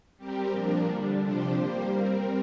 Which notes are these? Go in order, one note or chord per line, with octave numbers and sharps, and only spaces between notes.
G3 C4 G4 A#4
A#2 F3 D4 A#4
D3 G3 D4
C3 F3 D4 G4 C5
G3 A#3 G4 C5
G3 C4 A#4